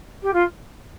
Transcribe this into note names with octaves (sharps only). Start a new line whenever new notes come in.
G4
F4